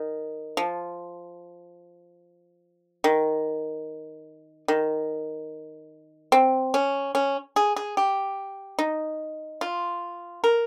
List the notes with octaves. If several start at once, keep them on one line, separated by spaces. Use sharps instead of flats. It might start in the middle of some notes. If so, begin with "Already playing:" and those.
Already playing: D#3
F3
D#3
D#3
C4
C#4
C#4
G#4
G#4
G4
D#4
F4
A#4